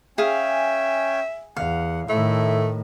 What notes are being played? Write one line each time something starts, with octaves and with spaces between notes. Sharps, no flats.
C#4 G#4 E5 F5 G5 G#5
E2 F5 F#5
A2 D#3 A3 E4